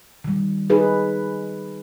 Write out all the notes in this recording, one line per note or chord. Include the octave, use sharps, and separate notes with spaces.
D#3 G3
D#4 G#4 B4